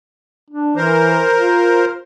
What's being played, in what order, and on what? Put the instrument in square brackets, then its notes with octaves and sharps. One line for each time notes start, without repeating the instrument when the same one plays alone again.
[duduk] D4
[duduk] E3 [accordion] A#4 C5
[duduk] F4